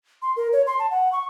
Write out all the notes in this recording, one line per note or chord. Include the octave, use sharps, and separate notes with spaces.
C6
A#4
C#5
C6
A5
F#5
C#6